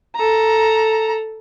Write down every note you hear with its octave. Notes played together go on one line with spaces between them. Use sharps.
A4 A#5